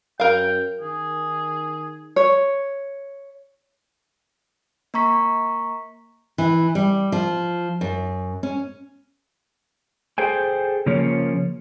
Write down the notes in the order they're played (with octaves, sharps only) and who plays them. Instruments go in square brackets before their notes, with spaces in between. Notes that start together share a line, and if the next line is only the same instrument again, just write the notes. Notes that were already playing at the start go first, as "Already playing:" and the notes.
[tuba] F#2 [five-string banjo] A#4 F5 [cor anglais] G5
[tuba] D#3 [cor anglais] G#4
[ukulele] C#5
[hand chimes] A#3 A#5 C#6 B6
[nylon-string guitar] E3
G3
F3
F#2
C#4
[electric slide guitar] G#4 A4 C5 G5 G#5
C#3 F3 A#3 C#4 C#5